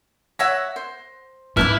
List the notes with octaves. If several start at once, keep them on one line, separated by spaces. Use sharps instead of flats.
C#5 E5 F#5 A#6
C5
G#2 E4 B4 A5 D6 F6